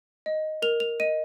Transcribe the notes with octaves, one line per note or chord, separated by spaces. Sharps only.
D#5
A#4 F7
F7
D#5 D#7